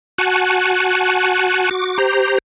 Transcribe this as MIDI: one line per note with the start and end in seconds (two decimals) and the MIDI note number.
0.18 1.69 66
0.18 1.69 78
0.18 1.69 80
0.18 1.69 81
0.18 1.69 90
1.71 1.98 66
1.71 1.98 86
1.98 2.38 67
1.98 2.38 72
1.98 2.38 82